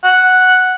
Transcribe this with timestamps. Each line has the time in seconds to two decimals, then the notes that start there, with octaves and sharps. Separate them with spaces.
0.04 F#5